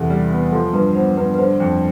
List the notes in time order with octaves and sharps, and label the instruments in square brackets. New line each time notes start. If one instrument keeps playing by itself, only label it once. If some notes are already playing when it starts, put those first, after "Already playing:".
Already playing: [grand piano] E2 C3 B3 [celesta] A4
[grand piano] G3
B3
[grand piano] F3 [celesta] A4
[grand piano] G2 [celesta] B4
[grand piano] B3 [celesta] C5
[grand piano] G2 [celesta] B4
[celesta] B4
[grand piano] D3 [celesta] C5
[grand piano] F2